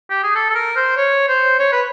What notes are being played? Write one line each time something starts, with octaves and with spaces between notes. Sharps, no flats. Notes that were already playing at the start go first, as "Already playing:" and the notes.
G4
G#4
A4
A4
A#4
C5
C#5
C5
C#5
B4